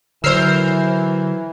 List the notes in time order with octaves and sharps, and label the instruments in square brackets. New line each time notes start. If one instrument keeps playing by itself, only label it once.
[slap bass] D3 F#3 [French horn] E3 [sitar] A#4 C5 [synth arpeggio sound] E6 F6 C7